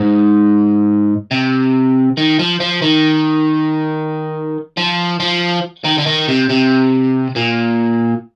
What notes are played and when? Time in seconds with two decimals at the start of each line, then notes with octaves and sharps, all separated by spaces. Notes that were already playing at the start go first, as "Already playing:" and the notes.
Already playing: G#2
1.31 C3
2.17 D#3
2.39 F3
2.60 F3
2.82 D#3
4.77 F3
5.20 F3
5.84 D#3
5.98 D3
6.06 D#3
6.28 C3
6.49 C3
7.36 A#2